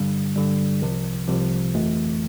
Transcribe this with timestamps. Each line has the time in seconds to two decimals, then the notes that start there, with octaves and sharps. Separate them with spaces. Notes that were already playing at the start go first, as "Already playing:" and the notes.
Already playing: G2 D3 G3
0.36 G2 D3 G3
0.82 C2 C3 F3
1.28 C2 C3 F3
1.75 G1 F2 E3 A3